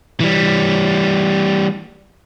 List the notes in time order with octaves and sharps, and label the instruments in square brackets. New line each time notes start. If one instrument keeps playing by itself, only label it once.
[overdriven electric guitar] E3 G3